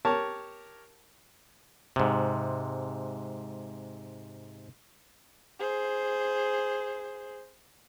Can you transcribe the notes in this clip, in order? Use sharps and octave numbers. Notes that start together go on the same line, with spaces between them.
G4 A#4 C#5 A5
G#2 C3
G#4 C5